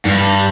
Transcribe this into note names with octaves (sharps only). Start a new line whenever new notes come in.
G2